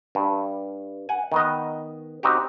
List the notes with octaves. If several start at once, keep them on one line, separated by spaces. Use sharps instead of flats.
G2
F#5 G#5
D#3 B3 D#5
C4 D#4 F#4 G4